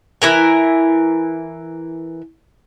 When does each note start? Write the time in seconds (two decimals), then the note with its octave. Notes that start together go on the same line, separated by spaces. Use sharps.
0.22 E3 E4 A#4 G#5